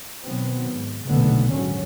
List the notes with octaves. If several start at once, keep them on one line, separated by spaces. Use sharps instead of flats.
B2 D#3 F#3 B3 C4
G#2
F#1 B1 A#2 D3 A3 B3
G#1 D#2 F#3 C#4